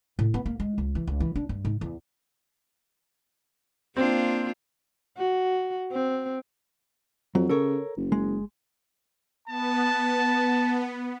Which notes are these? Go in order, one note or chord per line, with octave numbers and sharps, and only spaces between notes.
A2
B3
A#3
G#3
C#2
E3
C#2
E3
D4
G2
G#2
E2
A#3 C4 D4 F4
F#4
C4
F2 F#3
C#3 A4 A#4 C#5
F#1
G#3
B3 A5